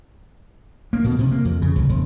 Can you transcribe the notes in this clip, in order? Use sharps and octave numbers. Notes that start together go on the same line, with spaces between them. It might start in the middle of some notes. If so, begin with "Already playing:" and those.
A#3
B2
C3
A#3
F2
C#3
C2
E1